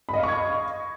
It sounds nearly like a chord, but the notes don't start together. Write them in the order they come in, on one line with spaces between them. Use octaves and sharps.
B5 D#5 F5 C#6 G#6